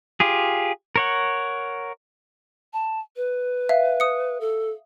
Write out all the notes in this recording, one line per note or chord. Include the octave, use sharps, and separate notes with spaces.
F4 G4 G#4
A#4 C#5 F#5
A5
B4
E5 F5
D#6 C#7
A4